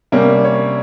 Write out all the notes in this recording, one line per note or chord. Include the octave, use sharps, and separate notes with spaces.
C3 G3 A#3 C#4
C#5